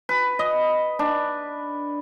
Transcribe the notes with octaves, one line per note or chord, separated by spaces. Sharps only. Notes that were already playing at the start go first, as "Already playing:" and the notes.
B4
D#5
D4